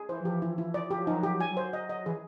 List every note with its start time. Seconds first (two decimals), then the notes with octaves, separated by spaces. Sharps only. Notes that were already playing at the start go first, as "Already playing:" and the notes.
Already playing: G#4
0.09 E3 C5
0.20 F3 G4
0.32 E3
0.42 E4
0.58 E4
0.74 F3 D5
0.86 F3
0.91 G4
0.97 F#3
1.04 F3
1.07 F#3 D#4
1.23 G4
1.40 G3 G#5
1.51 F#3
1.57 C5
1.73 D#5
1.89 D#5
2.06 E3 G#4